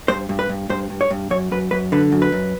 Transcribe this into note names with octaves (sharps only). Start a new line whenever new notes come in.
G2 C5
G2
B4
G2
G2 C5
G2
C#5
G2
F#2 C#5
F#2 B4
F#2 B4
D3 B4
F#2
B4
F#2